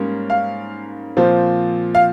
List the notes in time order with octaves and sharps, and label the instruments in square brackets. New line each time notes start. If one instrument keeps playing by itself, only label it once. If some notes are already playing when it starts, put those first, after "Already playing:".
Already playing: [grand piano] G#2 G3 A#3 C#4
F5
A#2 F3 C4
F5